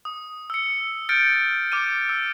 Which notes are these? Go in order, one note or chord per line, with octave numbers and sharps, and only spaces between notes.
D#6
E6 C#7
F6 G6 A6 C#7 D7
D6 F6 D#7
E6